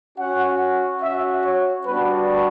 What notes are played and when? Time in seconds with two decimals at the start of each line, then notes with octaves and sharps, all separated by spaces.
0.18 C#4 F#4 F#5
1.02 C#4 F#4 E5
1.45 C#5
1.86 G3 B3 D4 F#4 B4